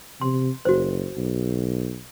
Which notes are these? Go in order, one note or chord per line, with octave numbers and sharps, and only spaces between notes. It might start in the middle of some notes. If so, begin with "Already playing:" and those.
C3 C6
F#1 F#4 C5
B1